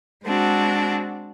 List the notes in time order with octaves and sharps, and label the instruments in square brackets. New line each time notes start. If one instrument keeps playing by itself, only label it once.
[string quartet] G#3 C4 D4 F#4